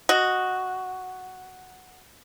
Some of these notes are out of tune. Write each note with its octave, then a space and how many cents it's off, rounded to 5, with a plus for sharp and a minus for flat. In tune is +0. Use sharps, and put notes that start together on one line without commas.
F#4 +0 D#5 +0